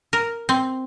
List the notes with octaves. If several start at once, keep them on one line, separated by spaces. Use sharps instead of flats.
A#4
C4